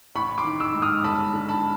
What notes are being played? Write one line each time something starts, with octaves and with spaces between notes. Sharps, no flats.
A1 B5 C#6
C6 D6
D#3
D6 E6
G#2
D#6 F6
G1 A5 B5
D3
A5 B5